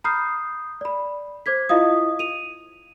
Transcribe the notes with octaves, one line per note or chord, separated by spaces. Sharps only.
A#5 B5 D#6 F6 G6 C7
D5 B5
C5 D6 G#6 B6
E4 F4 D#5 F5 D#6
D#7 F7